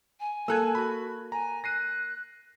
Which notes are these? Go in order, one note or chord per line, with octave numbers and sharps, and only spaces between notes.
G#5
A#3 A4 E6 F#6 G#6
F#4 B5
G#5 A#5
F#6 A#6 C7 D#7